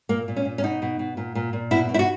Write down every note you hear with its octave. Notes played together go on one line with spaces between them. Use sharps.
A#2 A#3
A#2
C#4
A#2
C#4
B2 D#4
B2
B2
A#2
A#2
A#2
B2 E4
B2
E4
F#4